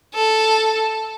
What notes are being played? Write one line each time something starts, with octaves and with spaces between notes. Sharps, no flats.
A4